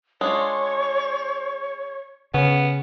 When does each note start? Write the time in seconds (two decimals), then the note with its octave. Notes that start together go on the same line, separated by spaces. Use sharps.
0.21 G#3 D4 F4 C#5
2.34 C#3 B3 C#4